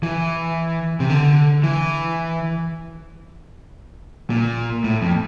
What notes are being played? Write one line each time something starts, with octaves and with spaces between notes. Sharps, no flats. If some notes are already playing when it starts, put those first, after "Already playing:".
E3
C3
D3
E3
A#2
A2
F2